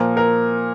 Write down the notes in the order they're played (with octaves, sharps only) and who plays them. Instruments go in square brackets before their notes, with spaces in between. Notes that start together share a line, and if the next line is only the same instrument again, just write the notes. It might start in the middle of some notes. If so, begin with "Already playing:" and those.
Already playing: [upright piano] A#2 F3 A#4
A#4